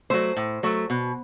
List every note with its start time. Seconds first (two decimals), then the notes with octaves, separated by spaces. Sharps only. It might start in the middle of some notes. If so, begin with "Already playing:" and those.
0.10 F#3 A3 C5
0.37 A2
0.63 F#3 A3
0.90 B2